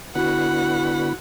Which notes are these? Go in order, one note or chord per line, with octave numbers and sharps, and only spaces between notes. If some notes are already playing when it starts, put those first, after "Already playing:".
D3 B3 E4 F#4 F#5 B5